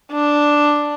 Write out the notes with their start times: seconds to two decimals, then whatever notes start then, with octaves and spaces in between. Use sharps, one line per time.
0.12 D4